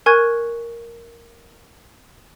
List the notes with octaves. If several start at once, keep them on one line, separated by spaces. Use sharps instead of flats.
A#4 G#5 C#6 F#6 G#6